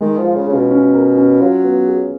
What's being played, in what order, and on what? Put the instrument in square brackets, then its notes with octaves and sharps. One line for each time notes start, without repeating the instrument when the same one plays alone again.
[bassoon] D#3 [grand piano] G#3
[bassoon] F3
[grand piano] F4
[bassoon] C#3
[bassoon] C#3 [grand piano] C#4
[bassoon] B2
[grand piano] C#4
A#4
C#4
[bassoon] F#3 [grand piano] F4
[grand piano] B3
G#4